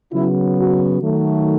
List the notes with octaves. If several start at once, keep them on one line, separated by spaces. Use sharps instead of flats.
C#3 F#3 B3 E4
F#4
D#3 F#3 A3